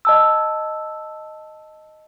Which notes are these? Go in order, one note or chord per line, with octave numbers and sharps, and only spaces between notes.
D#5 A5 E6